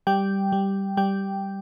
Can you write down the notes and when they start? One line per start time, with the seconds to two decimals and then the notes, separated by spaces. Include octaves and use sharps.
0.07 G3 G5
0.52 G3
0.97 G3 G5